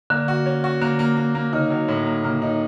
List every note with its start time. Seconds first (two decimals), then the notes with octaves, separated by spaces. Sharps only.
0.10 D3 A#3
0.28 F#4
0.46 C#4
0.64 F#4
0.81 D3 A#3
0.99 A#3
1.17 A#3
1.35 A#3
1.53 C#3 D#4
1.70 F#3
1.88 A2
2.06 A#3
2.24 C#3 A#3
2.42 D#4